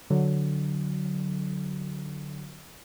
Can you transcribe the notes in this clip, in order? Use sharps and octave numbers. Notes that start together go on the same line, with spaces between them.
D3 F#3